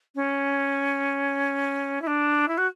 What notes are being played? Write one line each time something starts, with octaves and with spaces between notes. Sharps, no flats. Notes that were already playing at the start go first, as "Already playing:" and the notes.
C#4
E4
D4
E4
F#4